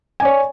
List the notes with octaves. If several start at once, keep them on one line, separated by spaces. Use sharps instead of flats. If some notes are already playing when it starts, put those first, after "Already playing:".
C#5 D5 G#5